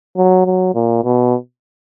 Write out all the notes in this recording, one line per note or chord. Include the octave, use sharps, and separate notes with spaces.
F#3
F#3
A#2
B2